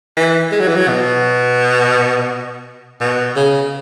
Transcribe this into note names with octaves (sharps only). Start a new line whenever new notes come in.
E3
G#3
F#3
E3
F#3
B2
B2
C#3